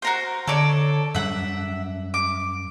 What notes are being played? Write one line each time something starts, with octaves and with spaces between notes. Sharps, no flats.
F#4 A#4 C5
D3 A4 C#5 D5
F#2 G3 E5 F#5
D6